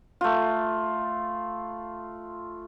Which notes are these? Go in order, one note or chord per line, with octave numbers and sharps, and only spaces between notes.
A3 F4